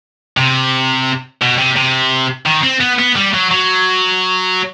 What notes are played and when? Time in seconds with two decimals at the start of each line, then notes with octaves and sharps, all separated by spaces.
0.37 C3
1.42 B2
1.59 C3
1.77 C3
2.46 D#3
2.63 C4
2.81 B3
2.99 B3
3.16 G3
3.34 F#3
3.51 F#3